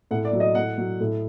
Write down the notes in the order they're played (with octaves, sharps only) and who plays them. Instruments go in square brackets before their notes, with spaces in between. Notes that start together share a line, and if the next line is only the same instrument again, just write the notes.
[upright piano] A2 F#5
D5
F#3
D#5
A2 F#5
F#3
A2